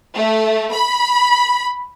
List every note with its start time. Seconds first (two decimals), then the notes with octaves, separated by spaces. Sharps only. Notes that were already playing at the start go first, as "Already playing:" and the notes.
0.15 A3
0.71 B5